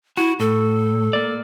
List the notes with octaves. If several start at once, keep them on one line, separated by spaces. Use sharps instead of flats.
E4 F#4
A2 A4
A#3 D5